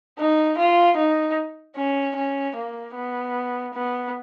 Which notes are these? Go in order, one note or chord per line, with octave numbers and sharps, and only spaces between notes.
D#4
F4
D#4
C#4
C#4
A#3
B3
B3